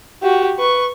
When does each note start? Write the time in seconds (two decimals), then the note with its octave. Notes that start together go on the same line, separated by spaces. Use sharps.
0.22 F#4 G4
0.58 B4 C#6